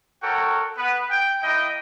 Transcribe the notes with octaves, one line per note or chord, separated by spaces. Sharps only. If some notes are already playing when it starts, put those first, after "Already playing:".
F#4 A4 A#4 C#5 F#5 G5
B3 B4
G5
A#3 E4 D#5 G5